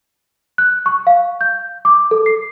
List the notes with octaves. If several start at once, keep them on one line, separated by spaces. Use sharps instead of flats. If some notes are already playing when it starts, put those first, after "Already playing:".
F#6
C#6
F5
G6
D6
A4
C7